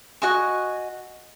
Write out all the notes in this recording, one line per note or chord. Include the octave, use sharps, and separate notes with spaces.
F#4 D#5 G#5 C#6